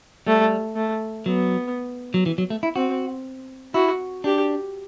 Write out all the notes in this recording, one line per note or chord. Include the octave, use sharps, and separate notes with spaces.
G3 A3
A3
F#3 B3
F#3
E3
F#3
A3
E4
C4 F#4
E4 F#4
D4 G4